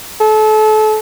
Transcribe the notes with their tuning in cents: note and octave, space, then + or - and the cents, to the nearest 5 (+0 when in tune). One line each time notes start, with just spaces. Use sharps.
A4 -30